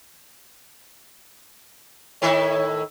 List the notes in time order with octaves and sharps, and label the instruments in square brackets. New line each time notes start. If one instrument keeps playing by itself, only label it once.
[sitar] A2 D#3 E4 [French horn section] C#5